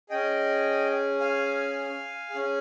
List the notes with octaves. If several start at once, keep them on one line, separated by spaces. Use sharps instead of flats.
C#4 G#4 D#5 G5
F5 G#5
C#4 G#4